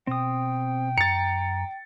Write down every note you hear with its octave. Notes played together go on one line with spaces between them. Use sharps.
B2 C4 G5 D#6
F#2 A#5 A6 C#7